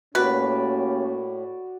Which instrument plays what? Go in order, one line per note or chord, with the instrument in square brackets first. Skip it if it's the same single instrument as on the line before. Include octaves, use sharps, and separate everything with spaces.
[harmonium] A2 [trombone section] A#3 C#4 G4 [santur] F#4 D5 [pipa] B4